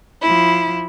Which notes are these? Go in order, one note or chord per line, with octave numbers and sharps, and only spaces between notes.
F3 E4